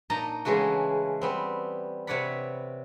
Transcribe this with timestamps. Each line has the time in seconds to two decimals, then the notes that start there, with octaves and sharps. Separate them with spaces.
0.10 A#2 D#4 A5 A#5
0.45 C#3 E3 G#3 A3 F#4
1.21 G3 B3 C4
2.07 C3 B4 C#5 D5 F#5 B5